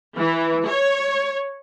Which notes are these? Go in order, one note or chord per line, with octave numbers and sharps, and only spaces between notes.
E3
C#5